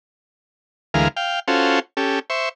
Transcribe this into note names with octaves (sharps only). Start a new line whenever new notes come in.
D2 E3 G#3 A#4 F5
F5 G5
C#4 F4 F#4 A4 C5
C#4 G4 A4
C5 E5 C#6